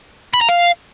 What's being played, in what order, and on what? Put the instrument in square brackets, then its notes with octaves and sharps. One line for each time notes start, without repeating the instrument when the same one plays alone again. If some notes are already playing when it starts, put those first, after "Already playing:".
[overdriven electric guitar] B5
A#5
F5